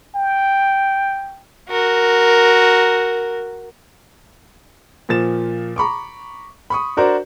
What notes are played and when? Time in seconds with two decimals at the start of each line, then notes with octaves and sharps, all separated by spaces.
0.15 G5
1.69 F#4 A#4
5.09 A#2 F3 A6 E7
5.76 A#5 B5 C#6 D6
6.70 B5 C#6 D#6
6.97 D4 F#4 A#4 C5 D5